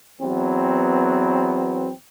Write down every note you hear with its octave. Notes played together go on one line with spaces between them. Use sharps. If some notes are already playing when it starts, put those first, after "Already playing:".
E2 F#3 B3 C4